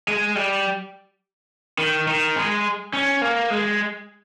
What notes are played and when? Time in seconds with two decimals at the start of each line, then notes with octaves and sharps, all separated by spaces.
0.08 G#3
0.36 G3
1.78 D#3
2.08 D#3
2.36 G#3
2.93 C#4
3.22 A#3
3.50 G#3